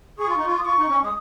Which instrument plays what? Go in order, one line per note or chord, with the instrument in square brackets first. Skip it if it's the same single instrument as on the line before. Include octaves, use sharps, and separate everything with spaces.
[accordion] G#4 [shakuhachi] C#6
[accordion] F4
D#4
F4
[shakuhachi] D#6
[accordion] F4 [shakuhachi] C#6
[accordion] D#4
C#4
G#3
[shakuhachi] D#6